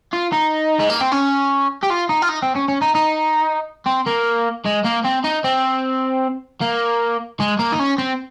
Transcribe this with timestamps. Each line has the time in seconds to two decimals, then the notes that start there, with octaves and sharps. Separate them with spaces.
0.13 F4
0.33 D#4
0.79 G#3
0.90 A#3
1.01 C4
1.12 C#4
1.83 G4
1.90 F4
2.09 D#4
2.22 F4
2.29 D#4
2.43 C4
2.55 C#4
2.68 C#4
2.82 D#4
2.95 D#4
3.86 C4
4.06 A#3
4.65 G#3
4.84 A#3
5.04 C4
5.24 D#4
5.44 C4
6.61 A#3
7.40 G#3
7.59 A#3
7.72 D#4
7.79 C#4
7.98 C4